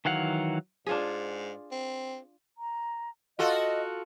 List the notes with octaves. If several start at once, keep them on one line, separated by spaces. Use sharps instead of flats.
D#3 E3 F#3 F5 F#5
G#2 D4 F4 G#4
C4
A#5
F4 F#4 A4 D#5